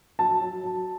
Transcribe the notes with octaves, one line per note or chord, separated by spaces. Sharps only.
F#3 A5
F#3
F#3